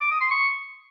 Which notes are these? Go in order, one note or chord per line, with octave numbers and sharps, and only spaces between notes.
D6
D#6
C6
C#6